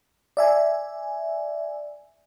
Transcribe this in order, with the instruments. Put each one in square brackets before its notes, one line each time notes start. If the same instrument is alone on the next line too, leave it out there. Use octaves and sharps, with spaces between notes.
[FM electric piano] D5 E5 G#5